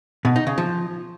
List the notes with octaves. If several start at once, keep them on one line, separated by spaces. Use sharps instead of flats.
B2
D#4
C#3
F3